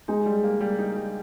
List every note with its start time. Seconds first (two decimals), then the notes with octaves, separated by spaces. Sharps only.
0.08 G#3 D#4
0.26 G3
0.44 A#3
0.61 G3
0.79 D#4
0.96 G3